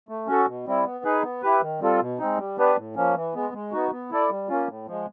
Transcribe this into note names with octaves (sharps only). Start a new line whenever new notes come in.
A3
C#4 F#4 A4
B2
G3 C4 E4
B3
D#4 G#4 B4
B3
E4 G4 B4
D#3
G3 C4 F4 A4
B2
G#3 C4 D#4
G3
B3 D4 G4 B4
A2
F3 A#3 C#4
E3
G#3 B3
G#3
B3 D#4 F#4
B3
E4 A4 D5
G3
A#3 C#4 F4
A2
F3 G#3